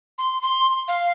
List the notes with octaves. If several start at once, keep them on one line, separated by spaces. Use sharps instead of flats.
C6
C6
F5